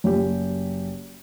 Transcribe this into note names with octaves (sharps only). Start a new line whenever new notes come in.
F#1 G4